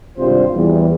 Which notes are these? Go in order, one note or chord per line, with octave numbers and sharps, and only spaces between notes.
G#1 G2 C3 G3 F4 C5
E2 G3